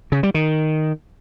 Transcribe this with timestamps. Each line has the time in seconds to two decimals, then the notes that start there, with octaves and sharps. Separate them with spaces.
0.12 C#3
0.23 G3
0.34 D#3